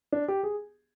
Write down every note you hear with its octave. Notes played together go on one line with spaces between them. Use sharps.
D4
G4
G#4